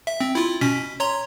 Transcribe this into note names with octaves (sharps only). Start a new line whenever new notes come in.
E5
C4
E4 F4
B2 C#4 B6
C#5 A#5 C6